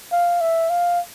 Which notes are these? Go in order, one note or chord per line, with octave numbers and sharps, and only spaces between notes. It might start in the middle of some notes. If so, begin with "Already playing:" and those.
F5
E5
F5